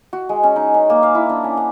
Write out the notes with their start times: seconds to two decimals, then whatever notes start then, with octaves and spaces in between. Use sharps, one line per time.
0.13 F#4
0.29 G#3
0.43 C#4
0.56 D#4
0.74 C#4
0.90 A#3
1.03 F5
1.15 E4
1.29 D4
1.44 C#4
1.57 F#5